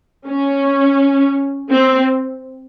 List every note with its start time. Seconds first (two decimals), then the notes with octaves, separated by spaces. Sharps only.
0.27 C#4
1.71 C4